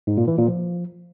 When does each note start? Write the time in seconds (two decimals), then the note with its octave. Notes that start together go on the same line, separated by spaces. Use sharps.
0.07 G#2
0.17 A#2
0.28 E3
0.38 A#2
0.48 F3